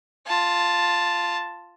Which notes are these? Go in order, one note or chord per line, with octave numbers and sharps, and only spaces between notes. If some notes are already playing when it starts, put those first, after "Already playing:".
F4 A5